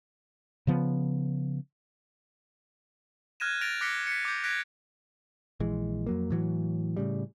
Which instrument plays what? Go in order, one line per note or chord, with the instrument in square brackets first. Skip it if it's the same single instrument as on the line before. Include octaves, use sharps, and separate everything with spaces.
[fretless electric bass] C#3 F3 B3
[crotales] F6 F#6 G#6 A#6 D#7 E7
A6 A#6 D7 F7
D6 F#6 A#6 B6 C#7 G7
B6 C#7
D6 G6
F#6 G#6 A#6 B6 D7
[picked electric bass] A#1 E3 G#3
F2 F#3 A#3
A2 E3 F#3
A2 C#3 G3